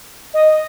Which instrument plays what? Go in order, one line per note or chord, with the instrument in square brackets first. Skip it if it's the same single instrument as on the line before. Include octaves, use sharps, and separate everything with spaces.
[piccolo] D#5